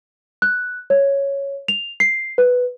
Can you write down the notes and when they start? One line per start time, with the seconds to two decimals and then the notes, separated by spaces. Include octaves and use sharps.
0.42 F#6
0.90 C#5
1.68 F7
2.00 C7
2.38 B4